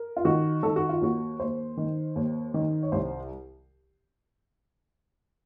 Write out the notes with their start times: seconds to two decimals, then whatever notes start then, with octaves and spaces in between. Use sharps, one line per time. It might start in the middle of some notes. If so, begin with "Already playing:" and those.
Already playing: A#4
0.17 F4
0.25 D#3 F#4
0.63 D#3 A4
0.76 F#4
0.89 F4
1.01 D#2 F#4
1.39 D#2 C5
1.77 D#3
2.16 D#2
2.54 D#3
2.82 C#5
2.92 C2 C5